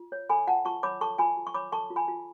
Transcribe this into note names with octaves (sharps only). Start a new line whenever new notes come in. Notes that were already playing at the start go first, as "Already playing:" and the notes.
Already playing: F4
C#5
A4 G#5 B5
F4 F#5 A5
F4 A5 C#6
C#5 B5 D6
A4 A5 C#6
F4 G#5 B5
F4
C#6
C#5 B5 D6
A4 A5 C#6
F4
G#5 B5
F4